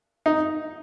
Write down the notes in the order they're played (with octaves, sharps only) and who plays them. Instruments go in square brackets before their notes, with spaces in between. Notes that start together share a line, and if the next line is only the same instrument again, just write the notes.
[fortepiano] D#4